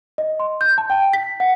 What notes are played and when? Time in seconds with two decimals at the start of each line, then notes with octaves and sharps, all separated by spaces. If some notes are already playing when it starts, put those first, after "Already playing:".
0.18 D#5
0.40 C6
0.61 G6
0.78 A5
0.90 G5
1.13 B6
1.40 F#5